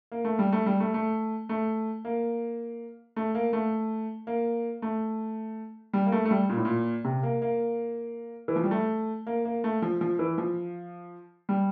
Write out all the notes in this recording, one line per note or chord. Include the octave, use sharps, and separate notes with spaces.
A#3
A3
G3
A3
G3
A3
A3
A3
A#3
A3
A#3
A3
A#3
A3
G3
A#3
A3
A3
G3
A#2
A2
A#2
C3
A#3
A#3
E3
F3
G3
A3
A#3
A#3
A3
F3
F3
E3
F3
G3